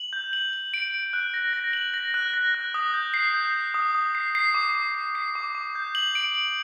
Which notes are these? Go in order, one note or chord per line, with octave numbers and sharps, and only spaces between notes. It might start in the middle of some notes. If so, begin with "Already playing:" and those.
Already playing: F#7
G6
F#7
F#7
D7
D7
F#6
A#6
A#6
F#7
A#6
F#6
A#6
F#6
D#6
G6
C7
G6
C7
D#6
D#6
C7
C7
D6
D6
C7
C7
D6
D6
G6
F#7
D7
F#7